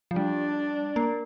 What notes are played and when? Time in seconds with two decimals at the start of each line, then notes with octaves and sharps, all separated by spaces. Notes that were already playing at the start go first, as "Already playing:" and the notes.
0.11 F3
0.16 G3 D4
0.96 A#3